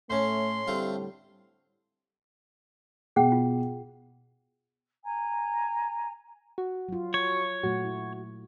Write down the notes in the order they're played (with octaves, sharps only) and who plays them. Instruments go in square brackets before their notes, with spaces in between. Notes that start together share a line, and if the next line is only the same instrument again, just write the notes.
[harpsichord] A2 C#4 [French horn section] A3 [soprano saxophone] C6
[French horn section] A2 D3 G3 [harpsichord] A3 C4 F4
[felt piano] B2 [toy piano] G#4 F#5 G5
[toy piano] F4
[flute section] G#5 A#5
[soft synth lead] F#4
[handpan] F#3 F4
[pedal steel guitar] C#5
[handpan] A#2 F#3 A3 [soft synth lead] F#4
[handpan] E4